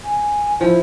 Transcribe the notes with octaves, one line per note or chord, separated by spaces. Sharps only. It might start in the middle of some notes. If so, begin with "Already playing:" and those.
G#5
F3 E4